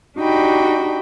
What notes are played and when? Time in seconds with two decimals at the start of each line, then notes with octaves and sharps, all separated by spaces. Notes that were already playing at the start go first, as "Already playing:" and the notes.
0.18 D4 D#4 F#4 G4 G5 B5